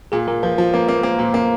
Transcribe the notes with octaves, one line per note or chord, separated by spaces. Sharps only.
A#2 G#4
A#2 A#4
F3 B4
F3 C5
A#3 B4
A#3
B4
A#3 C5
A#2
A#3